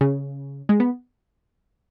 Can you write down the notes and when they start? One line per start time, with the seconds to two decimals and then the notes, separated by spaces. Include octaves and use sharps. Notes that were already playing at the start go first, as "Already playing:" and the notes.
0.01 C#3
0.69 G#3
0.80 B3